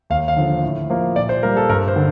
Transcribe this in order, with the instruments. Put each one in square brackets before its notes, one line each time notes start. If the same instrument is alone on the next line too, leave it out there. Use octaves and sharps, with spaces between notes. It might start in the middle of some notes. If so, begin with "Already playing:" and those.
[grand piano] D#2 F5
F5
D3 F3
A2
F3 A#3
A#2 D5
C5
G3 A#3 A#4
A4
G2 A#4
C5
D3